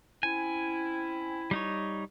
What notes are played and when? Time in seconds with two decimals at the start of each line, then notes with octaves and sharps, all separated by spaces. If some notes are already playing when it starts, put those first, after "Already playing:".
0.23 C4 C#4 E4 G#5
1.51 G3 D#4 C#5